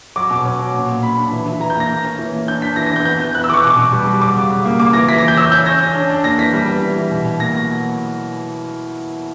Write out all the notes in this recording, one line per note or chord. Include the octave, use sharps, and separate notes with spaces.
F#3 D6
B2
C#4
F#3
A#2
A#2
A#2 B5
D4
E3
E3
E3 A#5
G6
A#3 A#6
A#3
C#4
E3
A#3
D4 G6
D4 B6
E3 A#6
A#6
B3 G6
B3 G6
E3
B3 F#6
E6
E3 C#6 D6
B2 D6
B2
G3
G3
F#3 D6
C#3
C#3
A#3
A#3 D6
E3 A#6
E3 B6
A#6
E3
G6
C#4 E6
C#4 G6
C#4 A#6
C#4
D4
D4
A#3 A#6
E3 B6
G3
B3
E3
E3
B2
B2
A#3 A#6
F#3